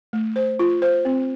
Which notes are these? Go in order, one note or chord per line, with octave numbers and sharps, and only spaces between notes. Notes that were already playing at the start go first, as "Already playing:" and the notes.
A3
C5
F4
C5
C4